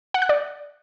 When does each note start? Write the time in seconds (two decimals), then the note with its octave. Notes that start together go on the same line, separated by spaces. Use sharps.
0.14 F#5
0.22 F#6
0.29 D5